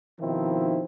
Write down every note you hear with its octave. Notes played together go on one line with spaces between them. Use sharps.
B2 D#3 F3 C4 D#4 E4